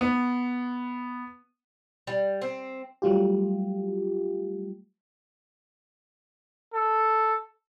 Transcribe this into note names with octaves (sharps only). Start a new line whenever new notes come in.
B3
G3
C4
F#3 G3 A3 F4 G4
A4